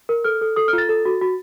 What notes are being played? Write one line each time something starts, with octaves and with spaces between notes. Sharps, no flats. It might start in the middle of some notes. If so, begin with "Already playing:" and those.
A#4
A4 F6
A4
A4 D#6
F6
F4
A6
A4
F#4
F#4